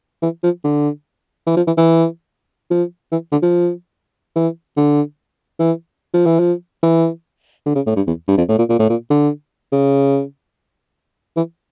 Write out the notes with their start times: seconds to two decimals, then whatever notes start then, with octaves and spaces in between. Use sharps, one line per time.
0.22 E3
0.43 F3
0.64 D3
1.47 E3
1.57 F3
1.67 E3
1.77 E3
2.71 F3
3.12 E3
3.32 D3
3.42 F3
4.35 E3
4.77 D3
5.59 E3
6.14 F3
6.26 E3
6.39 F3
6.83 E3
7.66 D3
7.76 C#3
7.86 A2
7.96 G2
8.07 E2
8.28 G2
8.37 F2
8.48 A2
8.58 A#2
8.69 A#2
8.79 A2
8.89 A#2
9.10 D3
9.72 C#3
11.37 E3